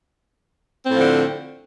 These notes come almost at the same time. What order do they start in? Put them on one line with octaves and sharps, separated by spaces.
C4 A2 F3 D3